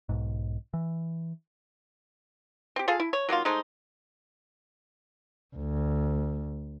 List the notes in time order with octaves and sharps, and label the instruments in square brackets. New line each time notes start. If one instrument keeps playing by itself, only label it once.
[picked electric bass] B1 G#2
E3
[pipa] C4 G4
F4 G#4 A4 F5
E4
C#5
F#3 A#3 D#4 F4
G#3 A3 D#4 C5
[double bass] D2